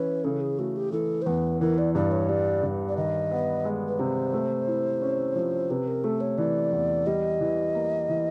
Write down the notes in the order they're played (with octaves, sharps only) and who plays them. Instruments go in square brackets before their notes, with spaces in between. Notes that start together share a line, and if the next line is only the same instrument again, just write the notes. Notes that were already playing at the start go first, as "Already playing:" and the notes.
Already playing: [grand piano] E3 C#4 E4 [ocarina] B4
[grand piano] C#3 [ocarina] A4
[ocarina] G#4
[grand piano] A3 [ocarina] F#4
[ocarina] G4
[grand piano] E3 [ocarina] A4
[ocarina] C5
[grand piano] E2 [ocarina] B4
[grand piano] E3 [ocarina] A#4
[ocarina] D5
[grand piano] G2 [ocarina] D5
[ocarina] C#5
[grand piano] G3 [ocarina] D5
[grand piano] G2
[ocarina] D5
[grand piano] D#3 [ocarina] D#5
[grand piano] B3
G#3
[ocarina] B4
[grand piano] C3 [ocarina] C5
[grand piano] A3
E4
C#4
F3
[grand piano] C3 [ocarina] B4
[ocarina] A#4
[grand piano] A3 [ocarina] A4
[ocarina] C#5
[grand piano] E3 [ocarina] D5
[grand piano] E2
[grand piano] G3 [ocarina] D#5
[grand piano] E3
A#3
E3